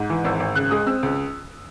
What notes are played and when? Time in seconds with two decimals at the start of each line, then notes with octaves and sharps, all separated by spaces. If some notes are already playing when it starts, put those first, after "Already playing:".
Already playing: G#2
0.10 E3
0.24 G#1 E6
0.40 G#1
0.55 C#3 F#6
0.71 G#3 D#6
0.86 C4 E6
1.03 C#2